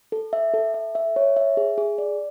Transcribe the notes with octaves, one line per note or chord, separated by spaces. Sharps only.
A4
E5
A4
E5
E5
C#5
E5
G#4
G#4
D5